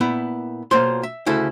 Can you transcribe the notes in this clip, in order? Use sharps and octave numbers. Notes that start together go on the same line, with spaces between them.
A#2 B3 E4
B1 A#3 F4 C5 C6
E5
D2 C#3 E4 A4